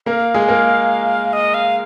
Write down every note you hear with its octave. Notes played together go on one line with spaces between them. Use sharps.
A#3 A#4 F5
G#3 G#4
A#3 A#4
D#5
F5